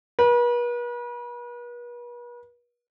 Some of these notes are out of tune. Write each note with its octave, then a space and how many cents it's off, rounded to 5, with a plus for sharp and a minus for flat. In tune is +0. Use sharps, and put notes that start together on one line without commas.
B4 -40